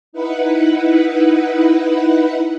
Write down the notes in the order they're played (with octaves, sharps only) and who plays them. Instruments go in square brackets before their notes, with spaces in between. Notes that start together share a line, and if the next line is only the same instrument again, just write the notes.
[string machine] D#4 E4 B4 F#5